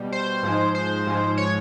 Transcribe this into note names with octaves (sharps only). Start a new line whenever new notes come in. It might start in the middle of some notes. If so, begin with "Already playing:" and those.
Already playing: B2 G3
C5
G#2 F3 G#3
C5
G#2 F3 G#3
C#5